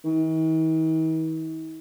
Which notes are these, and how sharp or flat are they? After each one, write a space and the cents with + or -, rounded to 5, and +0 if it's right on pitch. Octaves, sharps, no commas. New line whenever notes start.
D#3 +45